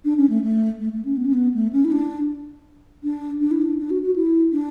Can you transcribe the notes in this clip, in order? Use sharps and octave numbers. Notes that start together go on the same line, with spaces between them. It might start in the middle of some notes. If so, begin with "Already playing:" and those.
D4
C#4
A3
A3
A3
A3
C#4
B3
C#4
B3
A3
C#4
E4
D4
D4
D4
E4
D4
D4
F#4
F#4
E4
D4